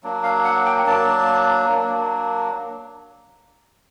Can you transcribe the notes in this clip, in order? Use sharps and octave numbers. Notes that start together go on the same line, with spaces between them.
F#3 A#3 D4
F5
F#5
G5
F#3 A#3 D4 A5
F#3 A#3 D4